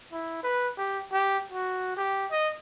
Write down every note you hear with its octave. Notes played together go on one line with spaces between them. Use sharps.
E4
B4
G4
G4
F#4
G4
D#5